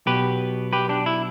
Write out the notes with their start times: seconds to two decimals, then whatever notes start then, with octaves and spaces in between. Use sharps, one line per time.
0.06 B1 B2 B3 G4 B4
0.73 G4 B4
0.89 D4 G4
1.06 E4